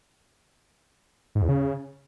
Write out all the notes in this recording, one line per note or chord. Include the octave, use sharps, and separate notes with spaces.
G#2
E2
C#3